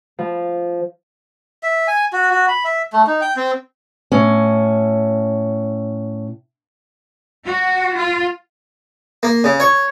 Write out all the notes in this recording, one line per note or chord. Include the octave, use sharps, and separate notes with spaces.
F3
E5
G#5
F#4
F#4
B5
E5
A3
D#4
G5
C4
A2 C#4
F#4
F4
A#3
C#3
C#5